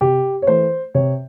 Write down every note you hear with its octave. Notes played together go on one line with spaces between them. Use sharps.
C3 G4
C#5
E3 A3 C5
C3 C#5